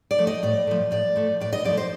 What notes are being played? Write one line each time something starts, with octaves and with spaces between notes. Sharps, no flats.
D5
F3 A3
D#5
A2 D5
F3 A3
A2 D5
F3 A3
A2 D5
D#5
F3 A3 D5
C5